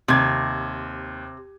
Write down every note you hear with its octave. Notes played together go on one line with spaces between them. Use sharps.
D#2 C3 G#6